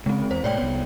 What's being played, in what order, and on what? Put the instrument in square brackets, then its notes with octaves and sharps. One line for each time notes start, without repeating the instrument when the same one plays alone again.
[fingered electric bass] C#3 [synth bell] G#3 C4
[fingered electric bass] E2 [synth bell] C5
[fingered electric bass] A2 C3 G#3 [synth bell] C#5 D5 G5
[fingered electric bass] C2 B3